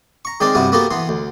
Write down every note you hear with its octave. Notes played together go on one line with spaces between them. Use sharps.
A#5 C#6
D#3 G#3 C4 D#4 A#4 D5
G2 C3 B3 E4 F#4
A#3 B3 F#4 G4 A4 A#4
E3 B3 C6
D2